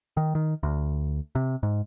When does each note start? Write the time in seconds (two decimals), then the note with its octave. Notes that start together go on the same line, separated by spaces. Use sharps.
0.17 D#3
0.35 D#3
0.63 D2
1.35 C3
1.63 G#2